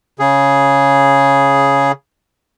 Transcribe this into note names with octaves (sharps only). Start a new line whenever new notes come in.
C#3 G#4